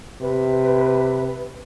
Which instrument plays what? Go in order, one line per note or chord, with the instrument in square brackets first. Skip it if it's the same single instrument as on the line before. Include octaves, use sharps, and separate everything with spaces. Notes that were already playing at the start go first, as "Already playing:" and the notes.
[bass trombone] C3 [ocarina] B4